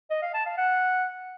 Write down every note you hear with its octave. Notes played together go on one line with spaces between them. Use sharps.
D#5
F5
A5
F5
F#5